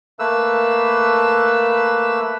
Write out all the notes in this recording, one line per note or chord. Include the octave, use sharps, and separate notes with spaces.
A3 A#3 B4 E6